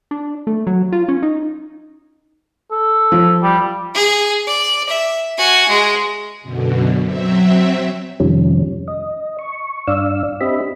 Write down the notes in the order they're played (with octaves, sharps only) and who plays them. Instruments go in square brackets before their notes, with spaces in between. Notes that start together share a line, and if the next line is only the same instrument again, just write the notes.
[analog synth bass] D4
A3
F#3
F4
C#4
D#4
[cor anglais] A4
[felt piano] F3
[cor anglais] G3
[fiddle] G#4
D5
E5
F#4 G#5
G#3
[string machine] F#2 B2 D3
F#3 C4 E5
[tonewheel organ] F2 C3 D#3 F3 G3 C#4
D#5
C#6
G2 D4 D5 F5 E6
C4 D4 G4 D#5 E5 B5